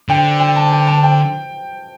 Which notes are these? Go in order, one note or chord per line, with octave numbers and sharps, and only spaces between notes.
D3 G5
G5
A5
G5
A5
G5